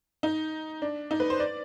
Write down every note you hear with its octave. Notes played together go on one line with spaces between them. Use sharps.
D#4
D4
D#4
B4
C5
D5